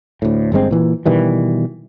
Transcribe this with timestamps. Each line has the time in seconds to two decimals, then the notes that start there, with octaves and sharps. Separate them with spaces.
0.22 D2 A2
0.52 G1 G2 G#3 C4
0.71 A#2 E3
1.06 B2 D#3 E3 G3